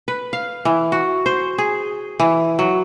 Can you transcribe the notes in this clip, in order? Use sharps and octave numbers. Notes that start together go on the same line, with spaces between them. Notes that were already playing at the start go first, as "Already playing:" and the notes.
B4
F5
E3
F#4
C5
G#4
E3
F#3